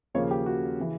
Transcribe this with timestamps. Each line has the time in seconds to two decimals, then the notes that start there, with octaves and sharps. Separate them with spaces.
0.14 D#2 C#3 F3 A#3 C#5
0.31 G4
0.46 F#4
0.80 C#3 E3